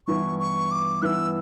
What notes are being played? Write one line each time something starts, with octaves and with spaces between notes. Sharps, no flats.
G2 E3 B3 E4 C#6
C#6
D6
G2 E3 B3 E4 E6 F#6